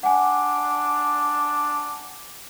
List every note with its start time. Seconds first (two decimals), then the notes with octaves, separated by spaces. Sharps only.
0.03 D4 F#5 G#5